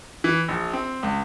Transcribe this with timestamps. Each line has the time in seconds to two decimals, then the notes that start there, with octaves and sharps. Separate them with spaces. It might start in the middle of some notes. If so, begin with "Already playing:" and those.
0.24 E3
0.48 A#1
0.73 C4
1.03 C#2